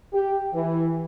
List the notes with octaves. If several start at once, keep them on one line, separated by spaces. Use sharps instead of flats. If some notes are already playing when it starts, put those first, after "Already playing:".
G4
E3